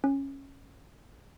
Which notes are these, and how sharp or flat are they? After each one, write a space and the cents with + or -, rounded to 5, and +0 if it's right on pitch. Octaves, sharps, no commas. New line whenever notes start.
C#4 -10